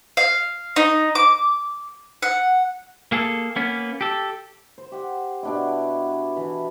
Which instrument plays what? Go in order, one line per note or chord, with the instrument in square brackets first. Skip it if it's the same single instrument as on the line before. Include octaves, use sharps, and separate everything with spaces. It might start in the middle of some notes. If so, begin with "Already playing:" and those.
[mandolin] F5
D#4
D6
F#5
[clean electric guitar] A#3 G#4 A4
A#3 B3 C#4
G4 A4
[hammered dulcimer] C5
G4 F#5
B2 D4 E4
E3